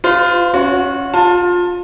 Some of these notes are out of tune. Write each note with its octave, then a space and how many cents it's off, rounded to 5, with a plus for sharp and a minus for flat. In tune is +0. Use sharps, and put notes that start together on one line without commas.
F4 +0 C5 -45
C#4 +0 F#4 -25 C#5 +25
F4 +20 A5 +20